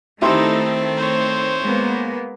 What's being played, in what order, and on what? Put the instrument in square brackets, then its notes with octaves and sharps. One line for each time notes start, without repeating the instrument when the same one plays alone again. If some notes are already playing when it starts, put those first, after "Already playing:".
[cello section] D#3 A3 [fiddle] C4 [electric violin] D#4 A4 [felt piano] E4 G4 C6
[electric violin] C5 C#5
[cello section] G#3 A#3 B3